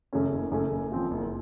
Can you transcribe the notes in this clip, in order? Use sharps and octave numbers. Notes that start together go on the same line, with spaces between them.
F#2 C#3 A3 C#4
F#1
F#2 C#3 A3 C#4
F#1
F#2 F3 C4 F4
F#1